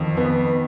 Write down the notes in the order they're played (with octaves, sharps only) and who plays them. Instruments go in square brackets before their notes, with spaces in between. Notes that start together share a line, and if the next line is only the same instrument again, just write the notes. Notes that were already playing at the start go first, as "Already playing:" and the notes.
Already playing: [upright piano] F2 F3 [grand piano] D#3
[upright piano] B3